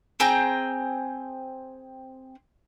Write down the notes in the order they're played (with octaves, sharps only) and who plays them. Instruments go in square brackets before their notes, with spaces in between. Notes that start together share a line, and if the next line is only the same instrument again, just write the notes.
[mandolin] C4 G#4 G5 A#5